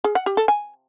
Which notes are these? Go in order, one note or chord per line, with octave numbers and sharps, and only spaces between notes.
G#4
F#5
G4
A4
G#5